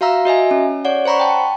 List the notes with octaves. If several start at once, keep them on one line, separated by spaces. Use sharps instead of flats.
F#4 E5 F5 A#5 E6
F#4 D#5 E5 G#5
C#4
C#5 D5 F#5
C5 F#5 A#5 B5 C#6
G5 A5